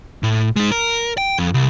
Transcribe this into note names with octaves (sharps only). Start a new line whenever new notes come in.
A2
G#3 D#4
A#4
G5
F2
C2